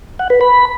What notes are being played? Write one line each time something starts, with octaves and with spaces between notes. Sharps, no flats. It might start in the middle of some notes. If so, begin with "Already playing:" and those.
F#5
B4
B5